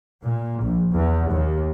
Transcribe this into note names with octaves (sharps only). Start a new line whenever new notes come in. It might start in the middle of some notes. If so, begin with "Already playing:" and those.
A#2
A#1
E2
D#2